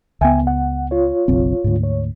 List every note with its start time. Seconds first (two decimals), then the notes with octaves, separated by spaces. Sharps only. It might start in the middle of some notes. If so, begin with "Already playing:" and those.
0.21 C#2 B3 E5 G5 G#5
0.47 F#5
0.91 F4 C#5
1.28 F#1 B1 C4
1.64 D2 G#2
1.83 C#5